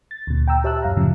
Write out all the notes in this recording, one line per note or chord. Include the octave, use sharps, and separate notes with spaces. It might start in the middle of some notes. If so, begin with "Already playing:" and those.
A6
D2 A#2
G5 A#5 E6
G4 C#5 E5 A5 E6 F#6
F#2 F5 A#5
F#2 A2 C#3 F3